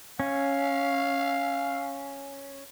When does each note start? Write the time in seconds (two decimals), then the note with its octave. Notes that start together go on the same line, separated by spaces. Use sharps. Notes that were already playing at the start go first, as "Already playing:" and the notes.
0.20 C#4 F5